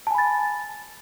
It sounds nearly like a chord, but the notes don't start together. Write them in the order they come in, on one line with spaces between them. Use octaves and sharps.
A5 G#5 B5 A6